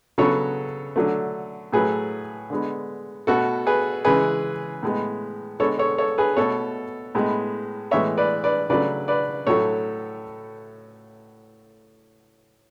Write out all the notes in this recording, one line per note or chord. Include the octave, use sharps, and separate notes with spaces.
C#3 F#3 B3 A4 C#5
D3 F#3 A3
A2 F#3 A3 G#4 B4
D3 G#3 B3
B2 A3 F#4 A4
G#4 B4
C#3 E3 G#3 G#4 B4
A2 G#3 B3
D3 G#3 B3 A4 C#5
A4 C#5
A4 C#5
G#4 B4
B2 A3 A4 C#5
A2 G#3 B3
A2 E3 G#3 B3 C#5 E5
B4 D5
B4 D5
C#3 F#3 A3 B4 D5
B4 D5
A2 F#3 A3 A4 C#5